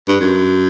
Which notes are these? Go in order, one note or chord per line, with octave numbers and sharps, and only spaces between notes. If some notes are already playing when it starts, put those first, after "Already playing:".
G2
F#2